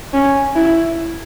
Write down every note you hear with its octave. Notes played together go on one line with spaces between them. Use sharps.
C#4
E4